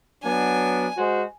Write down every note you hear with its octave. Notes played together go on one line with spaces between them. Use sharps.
F#3 B3 D4 G#5
G#3 F#4 C5